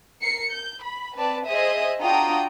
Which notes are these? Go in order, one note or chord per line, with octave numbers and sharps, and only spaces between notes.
A#4 C7 C#7
G6
B5
C4 B4 D5 A5
G#4 C5 D#5 E5 D#6
D4 F4 F#4 G5 A#5 D#6